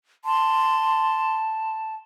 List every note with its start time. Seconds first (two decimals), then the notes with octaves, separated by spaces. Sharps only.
0.25 A5 C6